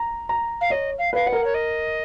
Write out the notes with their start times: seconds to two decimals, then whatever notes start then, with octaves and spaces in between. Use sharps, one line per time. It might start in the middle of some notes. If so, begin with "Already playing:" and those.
Already playing: A#5
0.29 A#5
0.61 F5
0.70 C#5 D#5
0.98 F5
1.13 B4 F5
1.26 B4 F#5
1.33 A#4
1.44 C#5
1.54 D#5